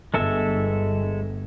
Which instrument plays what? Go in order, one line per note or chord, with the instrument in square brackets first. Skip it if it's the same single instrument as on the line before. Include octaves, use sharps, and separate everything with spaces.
[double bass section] G1 [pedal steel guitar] G#3 A4 E5